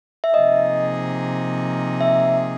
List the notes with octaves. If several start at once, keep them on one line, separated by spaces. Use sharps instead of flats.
E5
C3 F3 A#3 D#4 G#4 D#5
E5